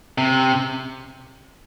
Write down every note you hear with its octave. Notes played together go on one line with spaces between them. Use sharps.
C3